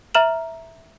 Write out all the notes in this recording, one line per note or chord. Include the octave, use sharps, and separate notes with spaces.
E5 A#5 F6 E7 F#7